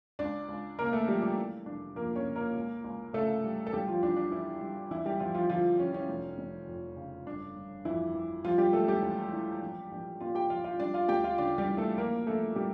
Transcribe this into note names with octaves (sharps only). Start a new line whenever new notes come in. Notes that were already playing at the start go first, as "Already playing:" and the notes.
C#2 D4 D5
C#2
C#3 A#3 A#4
A3 A4
F3 G3 G4
G3 G4
E3
F1 D4
F2 A#3 A#4
C#4 C#5
C#3
A#3 A#4
C#2
C#2
C#3 A3 A4
G3
A4
E2 G3 G4
F3 F4
E2 D4
D4
E3 E4
G3
E2 E3 E4
G3 G4
E2 F3 F4
F3 F4
D3 F3 F4
F3 C#4
C#4
F1
F1
F2
C#3
G1 D4
G1
F2 E3 E4
E3
F3 G3 F4
G3 G4
E1 A3 A4
G3 G4
E2
E3
A#1
A#1
A#2 F4 F5
G4 G5
F3 F4 F5
F4 F5
G3 D4 D5
F4 F5
D2 G4 G5
F4 F5
C#3 D4 D5
G3 G4
E3
A3 A4
A#1 A#3 A#4
A#1 A3 A4
A#2 G3 G4